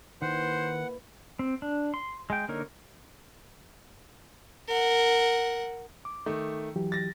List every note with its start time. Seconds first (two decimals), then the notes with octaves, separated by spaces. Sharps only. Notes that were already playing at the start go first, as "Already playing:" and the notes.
0.22 D#3 A#3 E4 B4 C5 F#5
1.39 C4
1.62 D4
1.94 C6
2.30 G#3 G5
2.48 D3 A#3 D#4 A#4 C#5
4.68 A#4 F#5
6.05 D6
6.26 D#3 A3
6.76 E3 F#3 G4
6.92 A6 A#6